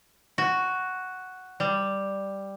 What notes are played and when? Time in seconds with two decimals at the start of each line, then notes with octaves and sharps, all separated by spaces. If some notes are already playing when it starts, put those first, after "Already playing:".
0.38 F#4
1.60 G3